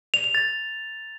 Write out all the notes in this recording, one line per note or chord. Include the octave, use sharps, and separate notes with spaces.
F7
F7
A6